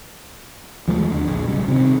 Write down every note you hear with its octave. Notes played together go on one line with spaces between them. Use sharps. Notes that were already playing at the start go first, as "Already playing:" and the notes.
D#2 F3 G#3 A3
D#2 D3
A#1
D1 C#3 G3
C3 D#3 C4